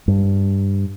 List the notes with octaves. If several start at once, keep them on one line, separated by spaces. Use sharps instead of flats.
G2